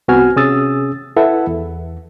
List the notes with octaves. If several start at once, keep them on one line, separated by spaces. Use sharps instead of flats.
C2 B3 C4 F#4 G#5 F6
C3 C#4 G#4 D#6 E6 A6
E4 A4 B4 E5 F#5
E2